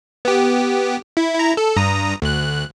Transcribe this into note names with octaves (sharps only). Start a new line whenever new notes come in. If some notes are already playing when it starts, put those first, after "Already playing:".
B3 G4
E4
E4 A#5
A4
G2 A#5 D#6
D2 F#6